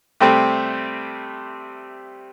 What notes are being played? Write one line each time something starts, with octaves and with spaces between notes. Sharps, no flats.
C3 G3 A3 C4